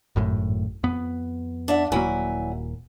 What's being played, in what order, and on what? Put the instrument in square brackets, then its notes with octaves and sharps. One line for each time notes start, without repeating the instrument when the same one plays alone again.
[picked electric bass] G#1 F#2 A2
F2 B3
[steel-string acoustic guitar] D4 E5 F#5
[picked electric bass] D#1 A#3 [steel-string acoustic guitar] F#3 E4 G#5